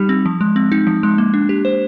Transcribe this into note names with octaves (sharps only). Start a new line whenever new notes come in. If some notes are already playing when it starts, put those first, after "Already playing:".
Already playing: G3 D#4 G4
C4
F3
G#3
C4
D#4
F3
G#3
A#3
D4
G4
C5